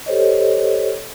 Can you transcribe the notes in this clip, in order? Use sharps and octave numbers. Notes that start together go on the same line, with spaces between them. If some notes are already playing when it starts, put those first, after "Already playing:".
G4 A4 C5 C#5 D#5